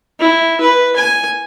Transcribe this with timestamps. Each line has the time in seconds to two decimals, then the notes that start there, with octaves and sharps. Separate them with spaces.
0.20 E4
0.61 B4
0.96 G#5